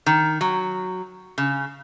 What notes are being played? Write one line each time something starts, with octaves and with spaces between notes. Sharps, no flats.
D#3
F#3
C#3